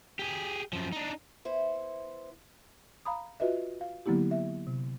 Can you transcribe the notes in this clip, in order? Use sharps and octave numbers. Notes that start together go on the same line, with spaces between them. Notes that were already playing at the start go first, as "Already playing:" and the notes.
G4 G#4
F#2 F3
D4 D#4
B3 E4 C5
F5 A#5 B5 D#6
F4 F#4 B4 D#5 E5
F5
D3 F#3 A#3 B3 E4 G4
E5
C3